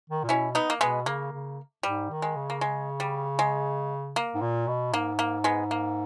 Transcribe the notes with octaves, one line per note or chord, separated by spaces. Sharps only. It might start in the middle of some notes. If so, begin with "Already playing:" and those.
D#3
A#2
B2 C#4 E4
B3 D#4
A#3
B2 G#3 B3
C#3 A#3
C#3
G#2 G3
D#3
G#3
C#3
A#3
G#3
G3
G#3
A#3
G#2
A#2
B2
G#2 A#3
A#3
G#3 B3
A#3